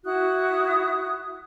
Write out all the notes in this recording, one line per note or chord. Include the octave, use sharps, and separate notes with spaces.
E4 F#4 D#6 F#6